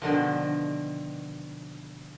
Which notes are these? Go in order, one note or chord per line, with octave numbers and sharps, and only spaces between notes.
B2 D3 D#3 F3